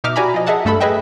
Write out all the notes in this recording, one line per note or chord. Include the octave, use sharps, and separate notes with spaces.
B2 D#4 E5 D6 F6
F#4 G4 D5 G#5 A#5 B5
F3 D#5
G#4 D#5 E5 F#5 A5
G2 A3 A4 E5 B5 E6
G#4 B4 D#5 E5 G5